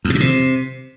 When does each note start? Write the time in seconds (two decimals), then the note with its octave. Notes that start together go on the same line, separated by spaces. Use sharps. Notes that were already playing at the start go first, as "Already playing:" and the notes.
0.05 E2
0.10 B2
0.15 A#2
0.20 C3